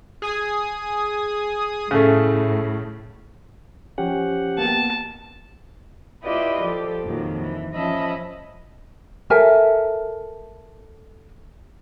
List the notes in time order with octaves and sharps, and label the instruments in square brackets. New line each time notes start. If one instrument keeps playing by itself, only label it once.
[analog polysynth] G#4 G#5 D#6
[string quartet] A2 [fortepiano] C#3 A3
[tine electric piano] F3 C#4 [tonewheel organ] G4 F#5
[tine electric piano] A#3 B3 [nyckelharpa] A5
[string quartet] E4 F4 G4 B4 D5 D#5
F3 G4 A4
F2 A#2 D#3 F3 F#3
E3
F3 C#4 D#5 E5 A5 B5
[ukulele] A4 A#4 E5 G#5